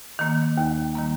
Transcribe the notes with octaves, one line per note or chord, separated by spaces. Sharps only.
D#3 A#3
D#2
D#3 G3 A#3